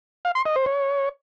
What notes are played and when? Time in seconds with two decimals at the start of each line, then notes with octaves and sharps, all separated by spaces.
0.25 F5
0.35 C6
0.46 D#5
0.56 C5
0.66 C#5